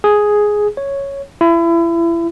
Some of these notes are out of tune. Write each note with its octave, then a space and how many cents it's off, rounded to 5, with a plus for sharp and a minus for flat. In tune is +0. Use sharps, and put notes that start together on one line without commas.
G#4 +5
C#5 +0
E4 +30